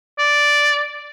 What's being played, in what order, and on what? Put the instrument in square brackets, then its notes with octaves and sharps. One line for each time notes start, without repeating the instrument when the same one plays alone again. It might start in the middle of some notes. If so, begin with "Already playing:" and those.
[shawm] D5